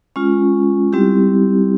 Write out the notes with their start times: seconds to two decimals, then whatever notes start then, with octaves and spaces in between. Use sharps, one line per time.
0.16 G#3 C#4 F4
0.93 G3 C4 E4 G4